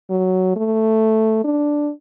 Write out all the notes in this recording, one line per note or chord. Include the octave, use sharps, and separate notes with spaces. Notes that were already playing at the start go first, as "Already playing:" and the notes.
F#3
A3
D4